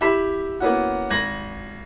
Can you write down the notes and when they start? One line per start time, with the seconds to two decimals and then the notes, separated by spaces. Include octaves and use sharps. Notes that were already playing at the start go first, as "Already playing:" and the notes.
0.01 E4 G4 E5 B5 B6 E7
0.60 A#3 B3 C#4 E4 F#4
1.10 G#1 G#6 A#6 F#7